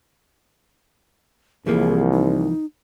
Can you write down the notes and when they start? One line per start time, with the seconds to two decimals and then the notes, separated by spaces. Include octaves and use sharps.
1.67 C2 E3 F3 A#3 G#4
2.12 D#4